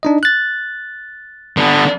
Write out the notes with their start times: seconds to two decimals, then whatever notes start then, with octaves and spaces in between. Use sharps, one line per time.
0.03 D4 D#4 D#5
0.23 F#6 A6
1.57 D3 B3